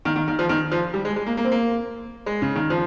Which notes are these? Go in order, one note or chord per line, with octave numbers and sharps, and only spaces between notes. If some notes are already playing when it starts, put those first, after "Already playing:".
D#3
D#3
D#3
F3
D#3
F3
G3
G#3
G#3
A#3
A#3
C4
A#3
G#3
C#3
D#3
F3